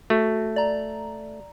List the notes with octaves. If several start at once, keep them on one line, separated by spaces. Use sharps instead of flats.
A3 F#4
D5 A#5